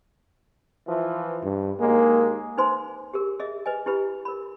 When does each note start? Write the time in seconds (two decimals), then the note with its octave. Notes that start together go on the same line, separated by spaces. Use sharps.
0.88 E3 F3
1.44 G2
1.81 D#2 G#3 A#3
2.58 D#4 B4 C5 G#5 C6
3.14 G4 G#4 A#4
3.40 G#4 D#5 E5
3.66 B4 D#5 G#5
3.86 E4 G4 B4 B5
4.25 A#4 B5